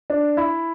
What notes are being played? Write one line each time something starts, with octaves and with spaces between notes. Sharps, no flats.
D4
E4